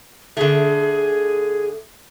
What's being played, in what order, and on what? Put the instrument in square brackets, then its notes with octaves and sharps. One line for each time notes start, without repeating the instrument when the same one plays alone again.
[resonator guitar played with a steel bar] D3 A3 [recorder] G#4